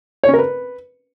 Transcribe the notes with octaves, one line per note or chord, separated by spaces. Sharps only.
C#5
C#4
A#4
B4